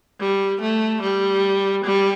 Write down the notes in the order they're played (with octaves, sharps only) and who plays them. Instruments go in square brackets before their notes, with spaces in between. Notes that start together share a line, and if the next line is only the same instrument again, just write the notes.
[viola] G3
A3
G3
G3